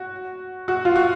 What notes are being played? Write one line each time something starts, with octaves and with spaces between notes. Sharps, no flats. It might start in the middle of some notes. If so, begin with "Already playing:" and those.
Already playing: F#4
F#4
F4
F#4